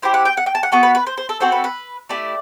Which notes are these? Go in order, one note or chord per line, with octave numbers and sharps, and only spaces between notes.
C4 E4 G4 C5
F#5
G5
F#5
G5
A5
F#5
B3 F#4 A4
B4
B4
C5
C5
A4
C4 F#4 A4 C5
B4
B4
A3 E4 G4 D5